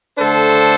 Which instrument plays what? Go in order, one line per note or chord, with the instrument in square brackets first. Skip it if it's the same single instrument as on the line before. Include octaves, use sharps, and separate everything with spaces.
[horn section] D3 A3 D4 A4 C5